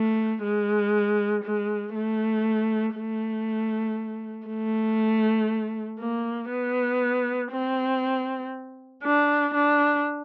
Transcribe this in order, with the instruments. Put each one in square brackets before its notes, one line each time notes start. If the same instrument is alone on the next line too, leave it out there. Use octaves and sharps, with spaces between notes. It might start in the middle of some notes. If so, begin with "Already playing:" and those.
Already playing: [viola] A3
G#3
G#3
A3
A3
A3
A#3
B3
C4
D4
D4